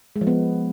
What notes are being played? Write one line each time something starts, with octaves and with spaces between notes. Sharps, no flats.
G#3
F3
B3